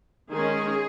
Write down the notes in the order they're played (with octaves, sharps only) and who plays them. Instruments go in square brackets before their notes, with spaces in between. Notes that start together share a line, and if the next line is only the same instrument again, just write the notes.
[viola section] D#3 G#3 C#4 G#4